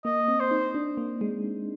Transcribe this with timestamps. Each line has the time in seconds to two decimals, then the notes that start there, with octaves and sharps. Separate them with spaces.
0.05 A#3 D#5
0.28 C4
0.40 C5
0.51 D#4
0.75 D4
0.97 A#3
1.21 G#3